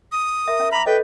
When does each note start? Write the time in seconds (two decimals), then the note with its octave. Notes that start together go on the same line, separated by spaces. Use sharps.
0.12 D#6
0.48 A#4 E5
0.60 C#4 E5
0.71 B4 A#5 B5 D6
0.86 A4 B4 C#5 D#5 G5